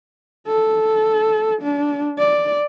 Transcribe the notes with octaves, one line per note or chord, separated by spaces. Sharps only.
A4
D4
D5